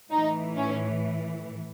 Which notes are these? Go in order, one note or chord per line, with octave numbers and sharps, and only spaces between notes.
A2 E3 D#4
C#4